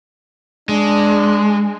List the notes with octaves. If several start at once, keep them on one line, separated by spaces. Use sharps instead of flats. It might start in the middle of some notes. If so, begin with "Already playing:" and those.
G#3 D4